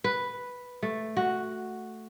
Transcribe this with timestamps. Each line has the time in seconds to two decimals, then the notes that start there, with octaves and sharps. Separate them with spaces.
0.04 B4
0.83 A3
1.17 F#4